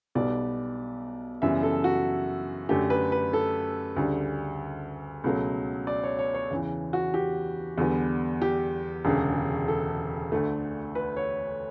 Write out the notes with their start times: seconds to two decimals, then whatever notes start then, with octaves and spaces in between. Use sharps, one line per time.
0.15 B1 B2 G3 B3 D5
1.42 F#2 C#3 E3 G3 B3 E5
1.63 A4
1.84 F#4
2.69 F#2 D3 A3 G4
2.90 B4
3.12 B4
3.33 A4
3.96 D2 C#3 G3
5.24 C#2 B2 F#3 A3
5.87 D5
6.03 C#5
6.19 C#5
6.34 C#5
6.51 E2 C#3 E3
6.93 F#4
7.14 G4
7.77 E2 D3 G3 B3
8.42 G4
9.05 E1 D2 C#3
9.68 A4
10.32 D2 D3 A3
10.95 B4
11.17 C#5